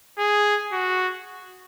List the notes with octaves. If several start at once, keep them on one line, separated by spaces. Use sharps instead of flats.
G#4
F#4